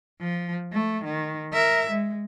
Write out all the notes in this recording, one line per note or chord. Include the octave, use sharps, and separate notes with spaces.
F3
A3
D#3
A#4 E5
G#3